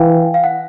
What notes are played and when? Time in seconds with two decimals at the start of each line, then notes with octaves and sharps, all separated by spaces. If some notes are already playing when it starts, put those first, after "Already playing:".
Already playing: E3 F5 G5 G#5
0.34 F5
0.44 F#5